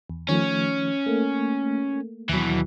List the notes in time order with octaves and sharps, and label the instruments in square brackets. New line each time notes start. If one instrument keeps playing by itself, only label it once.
[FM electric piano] E2
[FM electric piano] D#3 F3 A3 [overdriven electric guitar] C#4
[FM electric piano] A3 A#3
[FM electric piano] D#2 F#3 [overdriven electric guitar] B2 E3